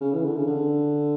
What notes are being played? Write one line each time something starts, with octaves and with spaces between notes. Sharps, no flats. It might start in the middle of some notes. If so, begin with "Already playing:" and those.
C#3
E3
D3
C#3
D3